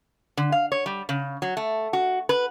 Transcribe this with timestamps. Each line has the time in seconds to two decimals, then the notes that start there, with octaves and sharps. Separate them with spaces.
0.37 D3
0.52 F5
0.72 C#5
0.86 G3
1.09 C#3
1.42 F#3
1.57 A3
1.93 F#4
2.29 B4